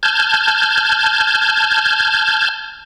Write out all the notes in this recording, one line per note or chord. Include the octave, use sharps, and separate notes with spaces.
A5 F6 G6 G#6